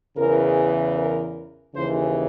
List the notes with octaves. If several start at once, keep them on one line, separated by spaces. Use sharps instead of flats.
E2 C#3 E3 A#4
A#4
D#2 C#3 E3 C5